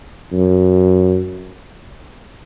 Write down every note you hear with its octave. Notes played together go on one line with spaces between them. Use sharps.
F#2